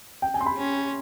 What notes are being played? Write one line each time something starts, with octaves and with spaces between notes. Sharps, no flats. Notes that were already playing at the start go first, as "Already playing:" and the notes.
G5
G#5
C6
B5
C#4